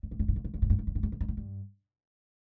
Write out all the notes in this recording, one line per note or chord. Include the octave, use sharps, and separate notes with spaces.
G2
A2
G2
A2
G2
A2
G2
A2
G2
A2
G2
A2
G2
A2
G2
A2
G2